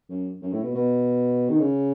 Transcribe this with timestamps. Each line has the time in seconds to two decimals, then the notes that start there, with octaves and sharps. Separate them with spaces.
0.10 F#2
0.42 F#2
0.53 A2
0.64 B2
0.75 B2
1.49 D#3
1.60 C#3